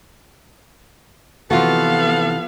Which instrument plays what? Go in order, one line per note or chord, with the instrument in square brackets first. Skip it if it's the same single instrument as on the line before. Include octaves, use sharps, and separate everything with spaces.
[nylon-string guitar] C3 E3 [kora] F3 F4 F#4 [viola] B3 F5 [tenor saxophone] A4